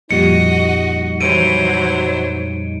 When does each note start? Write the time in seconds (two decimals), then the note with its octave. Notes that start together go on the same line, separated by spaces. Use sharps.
0.11 F2 A#2 G3 D#4 F#4 D#5 C#7
1.21 E3 F#3 C5 D7 D#7